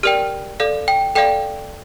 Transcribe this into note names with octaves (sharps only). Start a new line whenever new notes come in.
G4 A#4 D5 G5 F6
A4 D5 F5
G5
A4 D5 F5 G5